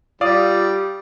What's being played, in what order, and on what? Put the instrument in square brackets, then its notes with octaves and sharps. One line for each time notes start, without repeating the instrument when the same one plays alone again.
[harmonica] G3 [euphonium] F4 [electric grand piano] D5 F5 D#6